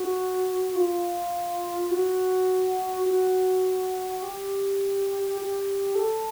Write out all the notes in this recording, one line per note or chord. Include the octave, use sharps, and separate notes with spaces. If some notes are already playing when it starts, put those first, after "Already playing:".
Already playing: F#4
F4
F#4
F#4
G4
G4
A4